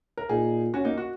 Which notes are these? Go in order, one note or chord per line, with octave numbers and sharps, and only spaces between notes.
A#4
A#2 D#4 G#4
C#4 F#4
A#3 D#4
F#4